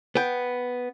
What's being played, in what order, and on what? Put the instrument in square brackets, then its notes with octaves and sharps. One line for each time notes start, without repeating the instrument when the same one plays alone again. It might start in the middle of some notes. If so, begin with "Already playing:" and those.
[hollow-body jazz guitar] B3 G5